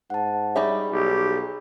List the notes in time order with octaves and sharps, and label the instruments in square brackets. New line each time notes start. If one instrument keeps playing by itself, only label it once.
[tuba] G#2 [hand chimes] F#5 A5
[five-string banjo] G3 D#4 E5 [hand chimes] G#4 C#5 B5
[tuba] B1 [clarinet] G4